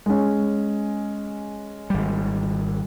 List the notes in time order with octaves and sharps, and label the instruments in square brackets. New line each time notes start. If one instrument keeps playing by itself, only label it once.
[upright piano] G#3 C#4
[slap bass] G#1 G3